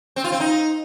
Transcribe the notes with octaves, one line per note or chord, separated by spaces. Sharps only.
C4
F4
C4
D#4